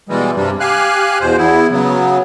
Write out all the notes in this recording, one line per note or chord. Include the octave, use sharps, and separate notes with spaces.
B2 E3 G3 G#3
G2 C3 G3
G4 F5 G#5 F#6
E2 B2 C5
E2 B3 E4
C#3 F#3 B3